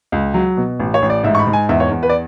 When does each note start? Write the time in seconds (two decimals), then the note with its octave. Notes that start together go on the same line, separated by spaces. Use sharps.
0.12 C#2
0.34 F#3
0.57 B2
0.80 A1
0.94 C#5
1.02 A1
1.10 D5
1.24 G#2 E5
1.35 C#6
1.39 B5
1.47 G#2
1.53 G#5
1.69 E2 E5
1.80 C#5
1.91 E2
2.03 B4
2.09 D5